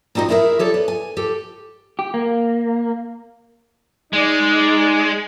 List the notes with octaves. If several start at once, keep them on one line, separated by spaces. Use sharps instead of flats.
G3 C4 D#4 F#4 D#5
E4 G#4 A#4 C5 E5
G4 A4 C#5 D5
B3
G#5
G4 A4
G4
A#3
G#3 D#4 D5